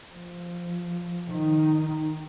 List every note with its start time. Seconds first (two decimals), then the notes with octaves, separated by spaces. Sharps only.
0.14 F3
1.31 D#3 D#4